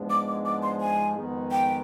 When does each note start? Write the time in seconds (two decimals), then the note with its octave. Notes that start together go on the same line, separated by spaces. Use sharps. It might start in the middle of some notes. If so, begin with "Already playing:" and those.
Already playing: G#2 F3 G#3 B3 D4
0.10 D6
0.28 D6
0.45 D6
0.62 C6
0.81 G#5
1.16 F2 D#3 G#3 B3
1.51 G5